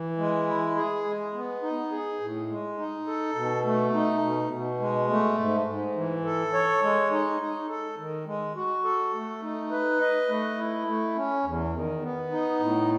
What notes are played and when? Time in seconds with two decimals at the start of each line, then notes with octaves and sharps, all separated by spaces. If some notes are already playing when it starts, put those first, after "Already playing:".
Already playing: E3
0.18 G#3
0.47 E4
0.76 G#4
1.05 G#3
1.34 B3
1.62 D#4
1.91 G#4
2.20 A2
2.49 G#3
2.78 D#4
3.07 A4
3.35 B2
3.64 A3
3.93 D#4
4.23 B2
4.52 B2
4.80 G#3
5.09 A3
5.38 G#2
5.67 G#2
5.96 E3
6.25 A4
6.53 C#5
6.83 G#3
7.11 D#4
7.40 D#4
7.69 A4
7.98 D#3
8.26 G#3
8.56 F#4
8.84 A4
9.14 A3
9.42 D#4
9.71 B4
10.00 D#5
10.29 A3
10.58 E4
10.87 A3
11.16 C#4
11.44 E2
11.74 D#3
12.02 B3
12.31 D#4
12.60 A2